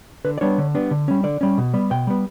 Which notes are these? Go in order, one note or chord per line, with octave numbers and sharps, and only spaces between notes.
D3 B4
D5
G3 B3 D4 C#5
D3
G3 B3 D4
D3
G3 C#4
D3 D5
G3 C#4
B2
G3 B3
B2 G5
G3 B3